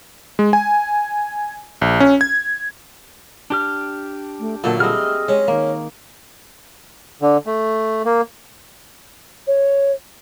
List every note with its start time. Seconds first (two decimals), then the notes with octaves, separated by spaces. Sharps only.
0.39 G#3
0.53 G#5
1.81 A#1
2.00 C#4
2.21 G#6
3.50 D4 G4 F6
4.40 A3
4.64 A#2 D3 F#3 A3 A#3
4.80 G3 C4 G#4 D#5 F6
5.28 G#3 C#4
5.48 D#3 A#3
7.22 D3
7.46 A3
8.05 A#3
9.47 C#5